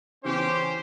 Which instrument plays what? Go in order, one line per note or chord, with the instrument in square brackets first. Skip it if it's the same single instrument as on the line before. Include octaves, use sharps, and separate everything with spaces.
[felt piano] C#3 E3 B3 [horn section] C#4 G4 [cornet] C5